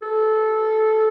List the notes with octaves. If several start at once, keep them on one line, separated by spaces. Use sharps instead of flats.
A4